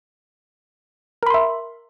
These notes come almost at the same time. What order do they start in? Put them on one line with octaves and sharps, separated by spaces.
A#4 B5 C6 E5